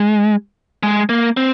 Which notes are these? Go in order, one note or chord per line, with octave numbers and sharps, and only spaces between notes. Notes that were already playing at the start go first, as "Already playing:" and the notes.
Already playing: G#3
G#3
A#3
C4